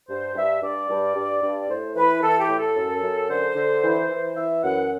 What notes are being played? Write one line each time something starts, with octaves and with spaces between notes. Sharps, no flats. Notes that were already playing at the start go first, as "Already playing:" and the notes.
G2 C5
G2 E5
G2 D5
G2
G2
G2
A2 C5
E3 B4
E3 A4
G4
A2
A4
F#2
F#2
D3 C5
D3
E3
E3
E3 E5
F#2 F#5